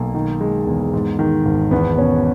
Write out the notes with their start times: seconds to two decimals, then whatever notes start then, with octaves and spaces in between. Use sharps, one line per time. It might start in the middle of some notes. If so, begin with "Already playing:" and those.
Already playing: B1 A#3
0.15 D#3
0.41 G#3
0.67 E2
0.94 G#2
1.19 D#3
1.45 G#1
1.71 E2 B3
1.98 B2 C#4